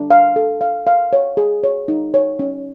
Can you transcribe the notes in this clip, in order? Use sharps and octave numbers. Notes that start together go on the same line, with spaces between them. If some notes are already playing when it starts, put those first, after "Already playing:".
Already playing: D4
F5
A4
F5
F5
C#5
G#4
C#5
D#4
C#5
C#4